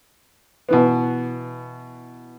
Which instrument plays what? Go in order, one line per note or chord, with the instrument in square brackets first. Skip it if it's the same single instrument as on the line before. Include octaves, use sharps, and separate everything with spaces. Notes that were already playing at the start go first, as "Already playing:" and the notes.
[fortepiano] B2 E3 B3